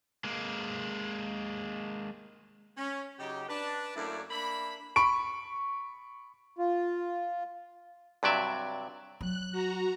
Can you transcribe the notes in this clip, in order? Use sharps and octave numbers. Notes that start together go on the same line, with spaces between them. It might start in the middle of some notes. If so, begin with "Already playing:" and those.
G#3 A#3
C#4
C#3 F#3 D#4 G4
D4 B4 A5
F#2 A3 A#3 E4 C#5 D5
A#3 D4 E5 B5
B5 C#6 D7
F4
G2 C3 F#3 D5 E5
F#3 F#6
F#4 A#5